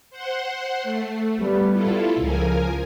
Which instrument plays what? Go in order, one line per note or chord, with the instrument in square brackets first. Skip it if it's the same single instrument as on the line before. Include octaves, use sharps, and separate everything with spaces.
[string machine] C5 F#5 C6
A3
[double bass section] G3 B3
[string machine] E4 F4 A4
[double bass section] C#2 [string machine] F3 A#4 G#5